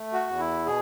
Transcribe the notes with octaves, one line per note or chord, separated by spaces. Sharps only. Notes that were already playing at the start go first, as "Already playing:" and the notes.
Already playing: A3
F#4
E2
E4
B2 G#4